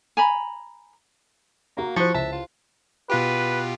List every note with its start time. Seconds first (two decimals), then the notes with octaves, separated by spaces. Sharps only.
0.17 G#5 A#5 B5
1.77 A#3 F#4 F5 A#5
1.96 F3 E4 G4 C5 C#6
2.14 C#2 E5 A5
2.32 F4
3.10 B2 F4 G4 B4